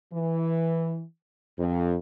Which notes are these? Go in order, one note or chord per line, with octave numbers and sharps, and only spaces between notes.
E3
F2